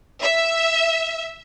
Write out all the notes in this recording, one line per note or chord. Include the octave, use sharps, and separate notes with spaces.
E5